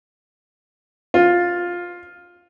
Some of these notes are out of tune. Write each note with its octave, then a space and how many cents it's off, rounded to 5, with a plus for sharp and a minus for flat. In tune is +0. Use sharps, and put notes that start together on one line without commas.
F4 +10